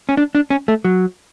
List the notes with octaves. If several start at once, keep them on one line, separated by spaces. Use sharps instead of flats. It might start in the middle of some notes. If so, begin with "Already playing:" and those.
C#4
D4
D4
C#4
A3
F#3